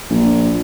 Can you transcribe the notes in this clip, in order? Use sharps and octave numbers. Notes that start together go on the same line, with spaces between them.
A#1